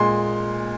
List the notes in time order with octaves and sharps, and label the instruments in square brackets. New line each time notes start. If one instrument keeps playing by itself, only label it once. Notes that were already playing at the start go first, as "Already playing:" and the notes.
Already playing: [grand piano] A#2 G#3 C6